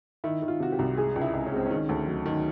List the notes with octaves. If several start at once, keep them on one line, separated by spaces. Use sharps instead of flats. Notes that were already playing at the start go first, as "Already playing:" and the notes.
D#3 E4
D#3
F4
C3 F#4
G4
C2
G#3 G#4
C#2
E4
C#2
C#4
G#3 C4
D#3 C#4
D2
F#3
D#3